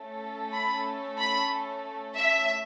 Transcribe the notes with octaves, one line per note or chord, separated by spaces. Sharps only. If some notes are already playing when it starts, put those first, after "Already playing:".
Already playing: A3 C#4 A4
B5
B5
E5